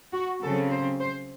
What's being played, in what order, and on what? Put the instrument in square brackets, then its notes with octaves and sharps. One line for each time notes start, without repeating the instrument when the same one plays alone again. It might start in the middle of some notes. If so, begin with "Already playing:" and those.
[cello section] F#4
C#3 F#3 C4 A4
C5
C5